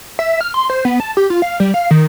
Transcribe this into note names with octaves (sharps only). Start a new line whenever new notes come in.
E5
F6
C6
C5
B3
A5
G4
F4
F5
G3
F5
D#3